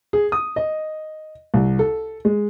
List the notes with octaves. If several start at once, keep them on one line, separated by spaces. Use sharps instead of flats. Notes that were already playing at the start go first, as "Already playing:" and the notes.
G#4
D#6
D#5
C2
A4
G#3